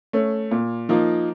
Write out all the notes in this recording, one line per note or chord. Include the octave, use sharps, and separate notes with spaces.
A3 C#4
A#2
F3 A#3 D#4